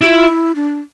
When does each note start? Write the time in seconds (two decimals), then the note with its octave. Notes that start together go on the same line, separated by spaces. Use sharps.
0.01 E4 G4
0.06 F4
0.28 E4
0.56 D4